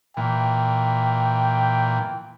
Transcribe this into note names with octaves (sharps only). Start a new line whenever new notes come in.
A#2 E3 G5